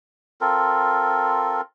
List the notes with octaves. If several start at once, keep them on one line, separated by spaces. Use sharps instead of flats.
C4 F4 A4 A#4